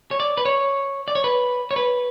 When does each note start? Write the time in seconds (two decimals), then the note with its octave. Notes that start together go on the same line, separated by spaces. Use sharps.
0.11 C#5
0.20 D5
0.38 B4
0.45 C#5
1.08 D5
1.15 C#5
1.24 B4
1.71 C#5
1.76 B4